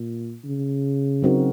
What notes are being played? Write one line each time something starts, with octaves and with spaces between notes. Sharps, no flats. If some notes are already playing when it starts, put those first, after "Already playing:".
Already playing: A#2
C#3
F#3 C4 D#4 F#4 A#4